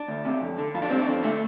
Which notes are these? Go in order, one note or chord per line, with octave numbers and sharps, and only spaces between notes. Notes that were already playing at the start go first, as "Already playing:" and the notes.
Already playing: D4
D2
C3
F2
D3
F2 F4
D4
C3 C4
D4
F2 C4
D3 A3